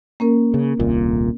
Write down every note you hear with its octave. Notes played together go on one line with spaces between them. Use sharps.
A#3 C#4 A#4
C#3
D#1 C2 A#2